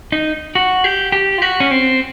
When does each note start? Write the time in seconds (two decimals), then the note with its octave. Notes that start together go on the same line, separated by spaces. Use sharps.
0.12 D#4
0.55 F#4
0.84 G4
1.12 G4
1.38 F4
1.42 F#4
1.60 C#4
1.71 C4